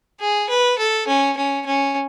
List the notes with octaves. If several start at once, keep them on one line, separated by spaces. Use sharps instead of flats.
G#4
B4
A4
C#4
C#4
C#4